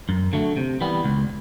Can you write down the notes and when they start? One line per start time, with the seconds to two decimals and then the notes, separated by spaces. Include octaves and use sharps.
0.09 F#2
0.33 D3 F#3 A3
0.57 C3
0.81 E3 G3 B3
1.04 C#2